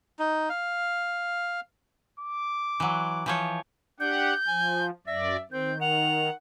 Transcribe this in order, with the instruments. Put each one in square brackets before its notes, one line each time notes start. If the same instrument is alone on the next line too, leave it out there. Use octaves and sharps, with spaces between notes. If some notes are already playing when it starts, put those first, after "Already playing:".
[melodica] D#4
F5
[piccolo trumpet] D6
[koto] E3 F#3
E3 F3 C#5
[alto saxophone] D4 [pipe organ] G4 F#5 [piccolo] G6
[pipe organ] F3 [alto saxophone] G#5
[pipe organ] F#2 D5 [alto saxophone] E5 [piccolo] A#6
[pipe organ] D#3 [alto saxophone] C4 [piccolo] G6
[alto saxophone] F#5 [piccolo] F7